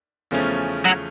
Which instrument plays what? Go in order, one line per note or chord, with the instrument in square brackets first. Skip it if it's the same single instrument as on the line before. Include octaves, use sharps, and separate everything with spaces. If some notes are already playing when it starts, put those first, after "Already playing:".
[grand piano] E2 C#3 F3 A3 C#4
[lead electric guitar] F#3